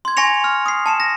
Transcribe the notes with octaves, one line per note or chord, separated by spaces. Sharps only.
C6 G#6
G#5 C#6 A#6 C#7 F7
F6
D#6 C7
A5 C#7 E7
A#6